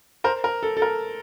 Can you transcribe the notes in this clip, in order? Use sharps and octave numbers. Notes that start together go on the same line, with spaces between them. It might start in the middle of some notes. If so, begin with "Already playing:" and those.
A#4 C5
A#4
A4
A4
A#4